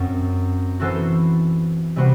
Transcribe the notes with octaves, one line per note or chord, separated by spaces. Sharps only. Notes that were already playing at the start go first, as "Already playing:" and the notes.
Already playing: F#2 F#3 C4
E3 B3 F#4 A4 C5
C3 G3 B3 F#4 C5